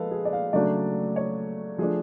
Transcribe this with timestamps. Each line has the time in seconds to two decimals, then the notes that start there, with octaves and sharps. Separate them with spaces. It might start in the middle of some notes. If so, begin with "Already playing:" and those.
Already playing: F3 G#3 A4 B4 F5
0.11 G#4
0.25 D5
0.33 F5
0.53 C#3 F#3 A3 D4 D5
1.16 C#5
1.78 F3 A3 D4 G#4